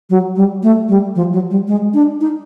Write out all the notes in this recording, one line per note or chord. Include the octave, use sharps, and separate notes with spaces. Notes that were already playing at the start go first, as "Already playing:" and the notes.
F#3
G3
A3
G3
F3
F#3
G3
G#3
D4
D#4